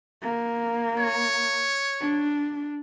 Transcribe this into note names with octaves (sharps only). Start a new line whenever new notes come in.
A#3
C#5
D4